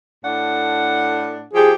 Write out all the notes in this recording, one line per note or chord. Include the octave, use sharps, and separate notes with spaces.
A2 D4 F#5
F3 G4 G#4